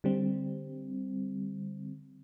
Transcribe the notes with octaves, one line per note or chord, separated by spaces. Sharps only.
D3 G3 C4